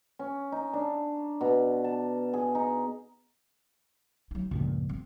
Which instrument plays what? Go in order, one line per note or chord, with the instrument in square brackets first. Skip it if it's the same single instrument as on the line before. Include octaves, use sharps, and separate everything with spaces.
[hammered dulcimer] C#4
D#4
D4
B2
A5
G#4
D#4
[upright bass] F#3 D#4
[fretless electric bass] C#2 G2 A#2 [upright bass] F3
[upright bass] C4